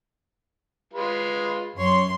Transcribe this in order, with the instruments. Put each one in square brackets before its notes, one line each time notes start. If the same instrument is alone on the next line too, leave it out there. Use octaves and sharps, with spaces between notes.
[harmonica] G#3 F4 B4
[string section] F#2 C6 [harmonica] C#5